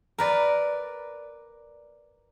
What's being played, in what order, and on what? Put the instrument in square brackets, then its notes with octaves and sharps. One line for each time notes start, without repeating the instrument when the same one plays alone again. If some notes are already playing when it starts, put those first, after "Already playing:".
[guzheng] A#4 B4 D5